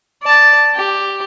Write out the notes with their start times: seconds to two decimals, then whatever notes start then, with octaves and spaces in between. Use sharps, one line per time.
0.23 D5 A5
0.75 G4